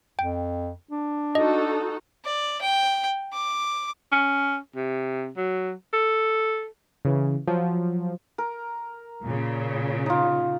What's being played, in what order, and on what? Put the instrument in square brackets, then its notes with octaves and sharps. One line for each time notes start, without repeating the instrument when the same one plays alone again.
[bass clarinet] F2 [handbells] G5
[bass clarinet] D4
[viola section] D#4 F#4 A4 [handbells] D#5
[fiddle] D5
G5
D6
[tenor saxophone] C#4
C3
F#3
A4
[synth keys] C#3 E3
F3 F#3
[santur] A#4
[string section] A#2 C#3
[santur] D#4 F4